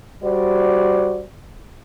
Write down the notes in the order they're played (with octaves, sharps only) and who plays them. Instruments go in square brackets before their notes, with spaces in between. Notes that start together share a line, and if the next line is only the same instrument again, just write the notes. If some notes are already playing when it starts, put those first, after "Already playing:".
[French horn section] G3 F#4 C5 D5